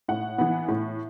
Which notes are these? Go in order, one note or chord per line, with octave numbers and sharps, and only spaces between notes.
A2 F#5
E3 B3
A2